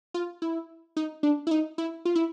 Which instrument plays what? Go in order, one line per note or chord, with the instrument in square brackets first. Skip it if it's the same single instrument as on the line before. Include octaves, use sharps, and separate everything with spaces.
[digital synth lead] F4
E4
D#4
D4
E4
D#4
E4
F4
E4